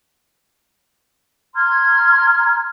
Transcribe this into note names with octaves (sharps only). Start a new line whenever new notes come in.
A#5 C6 F6 G#6